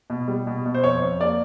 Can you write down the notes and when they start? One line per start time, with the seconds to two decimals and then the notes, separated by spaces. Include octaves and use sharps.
0.10 B2
0.28 G3
0.47 B2
0.66 B2
0.74 C5
0.84 F2 C#5
1.02 F2
1.20 A#3 D5